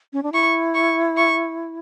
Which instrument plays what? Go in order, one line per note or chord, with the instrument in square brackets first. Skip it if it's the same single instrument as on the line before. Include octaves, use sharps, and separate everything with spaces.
[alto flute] C#4
D4
[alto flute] E4 [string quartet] C#6
[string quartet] C#6
C#6